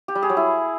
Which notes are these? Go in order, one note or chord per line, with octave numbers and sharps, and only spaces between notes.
G4
G3
G#4
F#3
E4